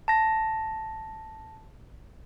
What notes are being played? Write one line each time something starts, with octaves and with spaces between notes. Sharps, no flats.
A5 A#6